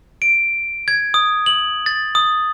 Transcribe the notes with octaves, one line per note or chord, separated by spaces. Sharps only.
D7
G#6
D#6
F#7
A6
D#6